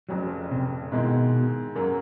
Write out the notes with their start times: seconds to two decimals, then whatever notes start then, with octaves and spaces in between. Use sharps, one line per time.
0.09 F1 F2 C#3 F#3
0.51 C3
0.92 G#2 B2 D#3 G#3 C4 E4
1.75 F#2 C#3 F#3 A#3